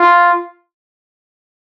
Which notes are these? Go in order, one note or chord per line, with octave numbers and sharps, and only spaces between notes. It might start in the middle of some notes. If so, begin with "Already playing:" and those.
Already playing: F4